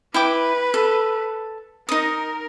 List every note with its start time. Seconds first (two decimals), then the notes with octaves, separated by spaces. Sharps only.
0.14 E4 B4 G5 D6
0.74 A4
1.89 D#4 A#4 D#6